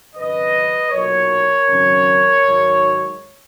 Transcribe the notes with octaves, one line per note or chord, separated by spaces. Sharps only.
G#1 F#2 C#3 B4 D#5
B1 A#2 F#3 A#4 C#5
G#1 F#2 C#3 F#3 C#4
G#2 D#3 F#3